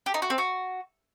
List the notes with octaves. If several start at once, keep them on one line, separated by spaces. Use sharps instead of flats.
G4
D#4
F#4
C4
F#4